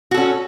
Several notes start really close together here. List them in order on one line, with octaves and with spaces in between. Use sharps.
F#4 A4 C#4